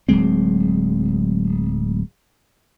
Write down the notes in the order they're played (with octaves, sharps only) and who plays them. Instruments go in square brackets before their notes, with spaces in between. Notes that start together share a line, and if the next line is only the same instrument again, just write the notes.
[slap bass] D1 F#3 G#3 C4